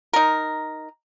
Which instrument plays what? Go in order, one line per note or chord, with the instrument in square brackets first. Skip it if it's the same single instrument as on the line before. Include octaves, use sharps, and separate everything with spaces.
[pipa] D#4 A#4